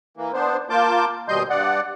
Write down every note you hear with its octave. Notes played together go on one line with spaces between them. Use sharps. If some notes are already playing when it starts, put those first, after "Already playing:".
E3 A#3
B3 D4 C5
A#3 F4 A5 D6 G6
D#2 B2 G3 D#5 C6 G6
G2 D5 F#5